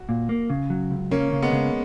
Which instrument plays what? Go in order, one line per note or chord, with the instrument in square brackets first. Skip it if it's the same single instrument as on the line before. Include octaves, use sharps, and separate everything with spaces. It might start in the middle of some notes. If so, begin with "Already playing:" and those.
Already playing: [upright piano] F#4
[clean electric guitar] A#2
A#3
C#3
F#3
C#2
[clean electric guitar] C#3 [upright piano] A#3 C#4
[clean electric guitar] C#3
[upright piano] G#3 B3
[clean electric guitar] C#3